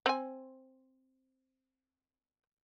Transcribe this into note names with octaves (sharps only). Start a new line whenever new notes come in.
C4 G#5